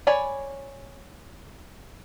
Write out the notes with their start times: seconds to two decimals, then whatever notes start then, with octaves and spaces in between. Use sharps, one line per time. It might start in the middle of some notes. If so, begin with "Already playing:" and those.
0.07 C#5 D5 G#5 B5